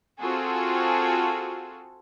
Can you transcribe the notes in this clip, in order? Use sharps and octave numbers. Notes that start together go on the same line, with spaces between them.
C4 F4 F#4 G#4 A4